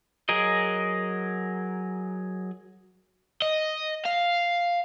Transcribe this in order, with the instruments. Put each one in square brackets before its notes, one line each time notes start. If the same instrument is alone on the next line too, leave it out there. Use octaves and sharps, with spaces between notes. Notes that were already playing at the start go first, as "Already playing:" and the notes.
[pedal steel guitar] F#3 G#4 A#4 D#5
[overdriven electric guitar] D#5
F5